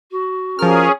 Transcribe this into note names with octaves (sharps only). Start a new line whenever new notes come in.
F#4
F3 C#4 G#4 A#4 F6